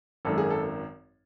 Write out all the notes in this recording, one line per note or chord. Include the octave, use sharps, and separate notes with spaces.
G#1 F#2 D#3 A4
G#4
A4